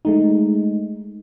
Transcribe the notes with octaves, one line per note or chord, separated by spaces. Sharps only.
G#3 A3 D#4